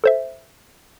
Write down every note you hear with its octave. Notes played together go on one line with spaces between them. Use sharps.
A4 C5 E5